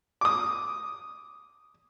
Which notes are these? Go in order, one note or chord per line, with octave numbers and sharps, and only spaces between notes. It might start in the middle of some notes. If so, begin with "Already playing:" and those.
D6 D#6